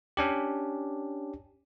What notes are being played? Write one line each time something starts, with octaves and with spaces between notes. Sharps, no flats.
C#4 D4 G4